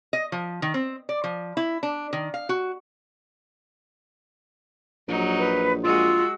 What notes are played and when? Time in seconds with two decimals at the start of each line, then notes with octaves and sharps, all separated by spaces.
0.13 D#5
0.32 F3
0.62 D#3
0.74 C4
1.09 D5
1.24 F3
1.57 E4
1.83 D4
2.13 D#3
2.34 F5
2.49 F#4
5.08 A#1 F#3 D#4
5.38 B4
5.84 G#3 F4 F#4 E6